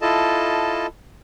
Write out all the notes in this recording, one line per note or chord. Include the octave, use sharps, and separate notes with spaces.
E4 F4 A4 D#5 A5